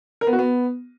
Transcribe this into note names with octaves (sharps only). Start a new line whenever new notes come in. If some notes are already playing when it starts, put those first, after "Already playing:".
A#4
B3
F#4
B3